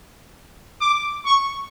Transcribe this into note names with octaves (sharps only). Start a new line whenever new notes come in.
D6
C#6